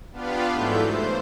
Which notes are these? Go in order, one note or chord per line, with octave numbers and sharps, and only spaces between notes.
B3 D4 F4 G4 B4 F5
G#2 E3 F#3 A3 E4 G6
C5